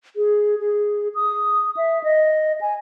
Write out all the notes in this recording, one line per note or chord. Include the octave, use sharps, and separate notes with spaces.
G#4
G#4
D#6
E5
D#5
G#5